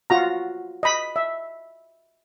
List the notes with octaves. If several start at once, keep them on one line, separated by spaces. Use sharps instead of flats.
F4 F#4 A#5
D#5 B5
E5